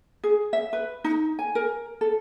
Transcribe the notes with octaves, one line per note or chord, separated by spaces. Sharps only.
G#4
E5
B4
D#4
G#5
A#4
A4